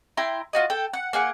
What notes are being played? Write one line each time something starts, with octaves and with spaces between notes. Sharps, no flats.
E4 G5 A#5 C6
F4 F#4 D#5
A4 G5
F#5
A#3 G#4 F#5